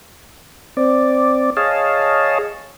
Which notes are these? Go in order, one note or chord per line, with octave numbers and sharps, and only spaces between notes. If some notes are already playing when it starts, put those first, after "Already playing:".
C4 D5
G#4 C#5 D#5 F5 A5